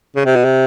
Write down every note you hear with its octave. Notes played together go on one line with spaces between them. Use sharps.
C#3
C3
B2
C3